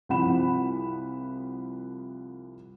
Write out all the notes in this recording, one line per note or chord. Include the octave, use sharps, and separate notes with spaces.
C2 F3 C4 F#5 B5 E7